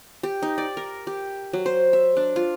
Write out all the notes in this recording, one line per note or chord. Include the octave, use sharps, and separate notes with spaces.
G4
D#4
D5
A#4
G4
F#3
C5
E5
D4
F4